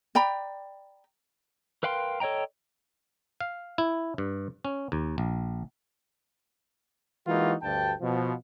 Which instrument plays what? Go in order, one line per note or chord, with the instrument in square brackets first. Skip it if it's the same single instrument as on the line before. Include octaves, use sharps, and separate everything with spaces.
[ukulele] D5 G5 A#5 B5
[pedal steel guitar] A#4 B4 F5 G5 C6
A4 C#5 D#5 G5 A#5
[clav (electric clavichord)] F5
E4
G2
C#4
D#2
A#1
[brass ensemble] E3 G#3 A#3 D#4 F4 F#4
D2 G2 G5 A5
B2 F3